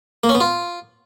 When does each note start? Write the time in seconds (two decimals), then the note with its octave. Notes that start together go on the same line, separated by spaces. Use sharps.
0.24 A#3
0.29 C#4
0.35 B3
0.40 F4